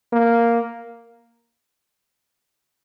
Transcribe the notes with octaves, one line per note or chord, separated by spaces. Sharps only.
A#3